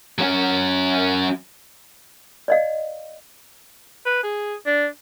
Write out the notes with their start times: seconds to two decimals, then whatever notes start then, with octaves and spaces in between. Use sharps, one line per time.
0.18 F#3 C#4
2.48 D5 D#5 F5
4.06 B4
4.23 G#4
4.66 D4